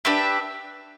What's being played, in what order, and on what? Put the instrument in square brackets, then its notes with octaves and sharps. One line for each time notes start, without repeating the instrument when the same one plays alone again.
[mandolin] D4 G4 B4 E5